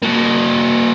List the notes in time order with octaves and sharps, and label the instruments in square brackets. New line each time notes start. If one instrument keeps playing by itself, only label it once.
[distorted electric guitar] A#3 F#4